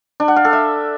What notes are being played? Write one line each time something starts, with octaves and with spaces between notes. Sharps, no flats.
D4
F#5
F5
A4
E5